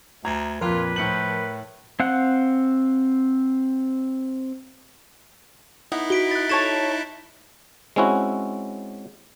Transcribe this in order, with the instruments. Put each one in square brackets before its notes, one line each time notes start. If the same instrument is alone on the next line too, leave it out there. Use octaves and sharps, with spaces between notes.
[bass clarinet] D2 [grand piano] A#5 G#6
[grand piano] F2 A#2 [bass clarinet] F4 [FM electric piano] A#4 [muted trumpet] B4
[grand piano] A2 C#7 F#7 [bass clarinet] F3
[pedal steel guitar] C4 F5 F#5 F#6
[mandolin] B3 [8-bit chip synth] D#4 E4
[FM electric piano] F#4 [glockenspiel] B6 D7 G7
[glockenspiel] F#6 A6
[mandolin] A4 C#5 A5 [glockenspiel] A6 E7
[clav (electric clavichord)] G#3 C4 C#4 E4 F#4